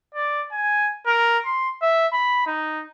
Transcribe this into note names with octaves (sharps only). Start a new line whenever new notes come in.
D5
G#5
A#4
C6
E5
B5
D#4